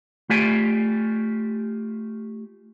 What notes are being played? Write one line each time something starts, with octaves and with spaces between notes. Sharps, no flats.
A3 F4 G4 D5 G#5